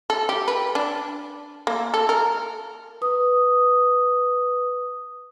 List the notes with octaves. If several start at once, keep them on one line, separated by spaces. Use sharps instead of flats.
A4
G4
B4
D4
A#3
A4
A#4
B4 D#6